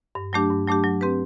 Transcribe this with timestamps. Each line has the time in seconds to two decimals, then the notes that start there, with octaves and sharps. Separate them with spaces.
0.15 G2
0.33 F#3 A3 D4 G4
0.50 G2
0.67 F#3 A3 D4 G4
0.84 F#3
1.01 C4 G4 B4